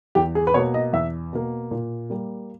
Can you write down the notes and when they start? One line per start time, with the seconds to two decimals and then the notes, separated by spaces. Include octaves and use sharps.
0.15 E2 G4
0.35 G#4
0.47 B4
0.54 B2 A#3 C#5
0.74 D#5
0.93 E2 E5
1.33 B2 A#3
1.71 A#2
2.10 G3 A#3